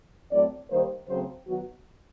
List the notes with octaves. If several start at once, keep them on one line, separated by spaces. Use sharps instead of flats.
A2 F#3 A3 C4 D5
D#3 G3 A#3 C5
C#3 F#3 A3 C4 C5
D#3 F#3 B3 F#4